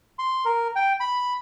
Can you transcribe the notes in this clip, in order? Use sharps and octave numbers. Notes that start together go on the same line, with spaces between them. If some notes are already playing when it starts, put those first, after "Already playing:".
C6
A#4
G5
B5